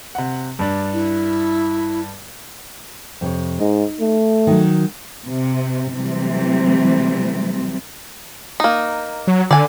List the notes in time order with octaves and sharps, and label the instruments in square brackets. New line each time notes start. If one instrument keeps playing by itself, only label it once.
[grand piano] C3 F#5
G2 D4
[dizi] E4
[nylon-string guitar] F2 C3 C#5
[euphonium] G#2 [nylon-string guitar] D#4
[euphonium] A3
[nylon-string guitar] D#3 F#3
[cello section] C3
C3 E3 F#3 G3 A3 C4
[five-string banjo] A#3 D#4
[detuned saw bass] F#3
[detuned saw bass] D3 [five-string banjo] D5 G#5